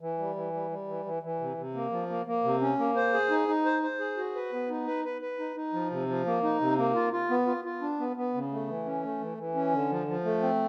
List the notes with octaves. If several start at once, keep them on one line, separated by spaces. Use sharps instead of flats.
E3
G3
E3
G3
G3
E3
E3
E3
C3
C3
A#3
F3
A#3
A#3
C3
C#4
A#3
C5
G#4
D#4
D#4
C5
C5
G#4
F#4
B4
B3
D#4
B4
B4
B4
D#4
D#4
F3
C3
F3
A#3
D#4
C3
A#3
F4
F4
B3
F4
F4
D4
B3
B3
C#3
A3
E3
C#4
A3
E3
E3
C#4
D3
F3
F3
A3
C4